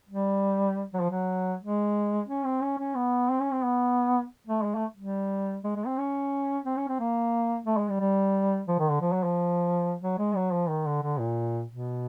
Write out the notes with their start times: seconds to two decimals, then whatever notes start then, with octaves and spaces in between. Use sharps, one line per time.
0.09 G3
0.94 F#3
1.02 F3
1.10 F#3
1.61 G#3
2.28 C#4
2.45 C4
2.61 C#4
2.79 C#4
2.96 B3
3.29 C4
3.40 C#4
3.51 C4
3.63 B3
4.47 A3
4.63 G#3
4.75 A3
4.97 G3
5.64 G#3
5.76 G#3
5.86 C4
5.98 C#4
6.65 C4
6.77 C#4
6.88 C4
7.00 A#3
7.66 A3
7.78 G#3
7.89 G3
8.00 G3
8.68 F3
8.79 D#3
8.90 D3
9.01 F3
9.12 F#3
9.24 F3
10.02 F#3
10.18 G#3
10.36 F#3
10.53 F3
10.69 D#3
10.86 D3
11.03 D3
11.19 A#2
11.71 B2